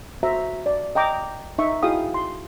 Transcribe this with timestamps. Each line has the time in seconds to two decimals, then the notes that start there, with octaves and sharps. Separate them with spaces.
0.23 F#4 C5 E5 A#5
0.66 D5
0.95 D#5 G5 A#5 D6
1.58 D#4 E5 C#6
1.83 E4 F#4 G#4 F5 G5 D#6
2.14 C6